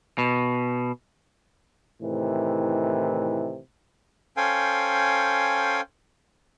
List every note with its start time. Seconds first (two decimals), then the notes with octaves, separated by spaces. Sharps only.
0.18 B2
2.01 A2 C3 D#3 E3
4.37 C#4 A4 C5 F5 G5 G#5